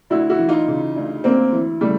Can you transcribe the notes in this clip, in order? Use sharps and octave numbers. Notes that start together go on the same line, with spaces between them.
D2 E4 F#4
E4 F#4
E3
D#4 F4
C#3
D2
D2 A#3 C4
E3
C#3 G3 A3